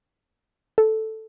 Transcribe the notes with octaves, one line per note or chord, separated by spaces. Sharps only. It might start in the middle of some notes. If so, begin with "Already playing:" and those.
A4